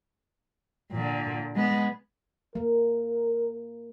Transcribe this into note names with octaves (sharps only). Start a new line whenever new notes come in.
A#2 D3
G#3 B3
A#3 A#4